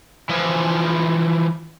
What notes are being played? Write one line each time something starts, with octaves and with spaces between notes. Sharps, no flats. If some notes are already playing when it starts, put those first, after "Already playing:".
E3 F3